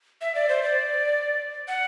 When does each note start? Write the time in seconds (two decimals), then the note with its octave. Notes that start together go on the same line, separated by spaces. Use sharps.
0.21 E5
0.35 D5
0.49 C5
0.63 D5
1.68 F#5